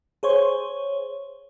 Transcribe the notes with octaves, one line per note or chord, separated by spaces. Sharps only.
G#4 C5 C#5